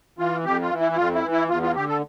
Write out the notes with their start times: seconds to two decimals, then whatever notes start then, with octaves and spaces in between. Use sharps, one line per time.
0.19 E3 F4
0.44 F2 G4
0.62 F4
0.71 E3
0.80 E4
0.92 E4
0.96 F2 F4
1.14 E4
1.23 E3
1.32 E4
1.49 E2 F4
1.62 F4
1.76 D3 G4
1.88 A4